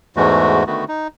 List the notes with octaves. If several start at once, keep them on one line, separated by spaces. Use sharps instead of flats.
E2 G#2 E3 G#3 A3 F#4
D3 D#3 A3 B3 F#4
D#4